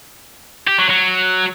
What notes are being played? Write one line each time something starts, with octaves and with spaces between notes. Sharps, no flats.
G4
F#3
F#3